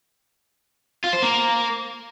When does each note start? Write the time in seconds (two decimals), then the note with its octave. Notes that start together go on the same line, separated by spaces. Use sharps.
1.04 F4
1.13 C5
1.22 A#3